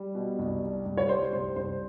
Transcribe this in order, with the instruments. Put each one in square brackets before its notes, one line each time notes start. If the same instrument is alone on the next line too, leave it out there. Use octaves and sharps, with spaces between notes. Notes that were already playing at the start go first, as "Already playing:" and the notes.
Already playing: [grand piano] G3
B2
C2
G3
C2
[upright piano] C#5
[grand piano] G3 [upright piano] C5
[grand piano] C2 [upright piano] C5
[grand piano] C2 [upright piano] C5